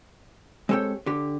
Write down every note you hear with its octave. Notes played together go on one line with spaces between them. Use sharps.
G#3 C4 G4 A4 C#5 G5
D3 G4